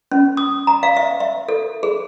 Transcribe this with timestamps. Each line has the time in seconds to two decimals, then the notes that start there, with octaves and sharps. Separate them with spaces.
0.12 C#4
0.37 D#6
0.67 A#5
0.83 F5
0.97 E5
1.20 E5
1.48 A4
1.83 G#4